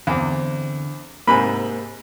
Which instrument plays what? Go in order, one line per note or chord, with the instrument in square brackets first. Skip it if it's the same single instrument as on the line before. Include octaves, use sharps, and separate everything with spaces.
[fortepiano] E2 [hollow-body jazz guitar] D3 C4
[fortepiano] G#2 C3 B5 [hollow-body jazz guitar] A#3 G#4